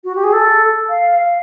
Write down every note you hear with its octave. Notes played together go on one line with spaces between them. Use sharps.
F#4
G4
G#4
A4
F5
F5